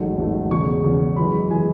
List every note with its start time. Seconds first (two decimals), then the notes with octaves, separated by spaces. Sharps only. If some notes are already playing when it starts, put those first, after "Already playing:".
Already playing: A1 G#2 D#3 F#3 A3
0.18 A1 G#2 D#3 F#3 A3
0.50 E1 E2 C#3 C#6
0.84 E1 E2 C#3
1.16 F#2 E3 G#3 B5
1.50 E3 G#3 G#5